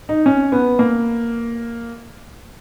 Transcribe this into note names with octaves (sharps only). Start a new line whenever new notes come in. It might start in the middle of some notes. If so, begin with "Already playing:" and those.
D#4
C#4
B3
A#3